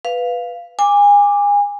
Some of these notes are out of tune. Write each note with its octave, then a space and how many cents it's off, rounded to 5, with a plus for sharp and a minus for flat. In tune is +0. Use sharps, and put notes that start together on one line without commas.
B4 +0 F5 +0
G#5 -30 D6 +0